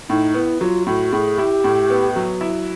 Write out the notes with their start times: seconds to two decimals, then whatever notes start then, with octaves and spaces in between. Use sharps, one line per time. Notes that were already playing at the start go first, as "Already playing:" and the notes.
0.09 A2 D#4
0.34 B3 E4
0.61 F#3 F4
0.86 A2 F#4
1.12 A2 G#4
1.38 E4 G4
1.64 A2
1.90 B3
2.16 F#3
2.41 E4